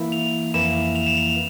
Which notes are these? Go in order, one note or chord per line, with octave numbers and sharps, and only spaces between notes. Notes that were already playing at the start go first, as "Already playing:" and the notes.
Already playing: E3 A#3 E4
F7
F2 E3 A#3 E4 E7
F7
E7
F7